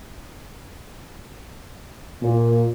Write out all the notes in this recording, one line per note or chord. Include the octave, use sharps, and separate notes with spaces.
A#2